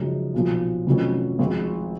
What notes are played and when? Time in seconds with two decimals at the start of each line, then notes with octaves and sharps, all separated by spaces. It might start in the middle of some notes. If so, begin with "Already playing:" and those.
Already playing: F#1 F#2 F3 G#3 D#4
0.34 B1 A#2 F3
0.87 F1 F2 D#3 F#3 C#4
1.39 G#1 G#2 F3